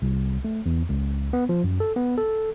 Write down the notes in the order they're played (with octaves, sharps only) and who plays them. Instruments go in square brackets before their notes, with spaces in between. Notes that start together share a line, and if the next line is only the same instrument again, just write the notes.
[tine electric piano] C2
A3
E2
C#2
B3
F3
F#2
A4
B3
A4